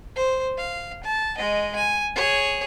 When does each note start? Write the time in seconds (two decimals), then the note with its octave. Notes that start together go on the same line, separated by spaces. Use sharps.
0.16 C5
0.58 F5
1.04 A5
1.38 G#3 D#5
1.76 G#5
2.15 G#4 C#5